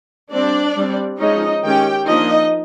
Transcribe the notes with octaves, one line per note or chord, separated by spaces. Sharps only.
G3 C4 D4 D5
G3 C4
F3 G#3 C#4 D#4 D#5
D#3 G#3 C#4 G4 G5
F3 A#3 D4 D#4 D#5